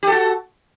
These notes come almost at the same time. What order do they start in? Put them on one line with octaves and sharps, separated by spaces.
G4 A4 F#4